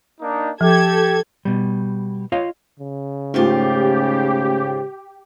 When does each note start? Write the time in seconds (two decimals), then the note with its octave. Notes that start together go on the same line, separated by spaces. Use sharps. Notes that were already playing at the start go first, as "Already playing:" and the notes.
0.21 A#3 D4 D#4
0.61 F3 G4 A4 G#6
1.45 B2 G3
2.32 F4 C#5 D#5 F5
2.80 C#3
3.34 G#2 D#3 A3 C#4 F4 G4